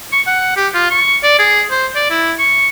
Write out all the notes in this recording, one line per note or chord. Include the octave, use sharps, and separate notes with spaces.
C#6
F#5
G4
F4
C#6
D5
G#4
C5
D5
E4
C#6